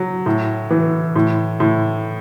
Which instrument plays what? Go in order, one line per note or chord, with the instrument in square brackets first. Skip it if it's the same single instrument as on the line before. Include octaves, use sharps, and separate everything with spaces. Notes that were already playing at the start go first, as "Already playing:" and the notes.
Already playing: [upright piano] F#3
A2
E3
A2
A2